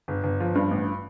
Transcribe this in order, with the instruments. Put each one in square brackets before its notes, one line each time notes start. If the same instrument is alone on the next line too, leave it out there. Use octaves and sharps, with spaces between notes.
[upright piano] G1
G1
F3
G2
A1